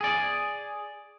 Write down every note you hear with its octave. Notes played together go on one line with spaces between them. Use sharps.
G#4 D5